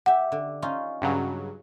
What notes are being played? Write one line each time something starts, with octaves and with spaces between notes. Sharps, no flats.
G4 E5 F#5
D3
C#4 D#4 F4
G2 C#3 F#3